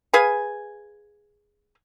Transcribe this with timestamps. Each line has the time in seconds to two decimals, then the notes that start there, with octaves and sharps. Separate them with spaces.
0.14 G#4 B4 F5 G#5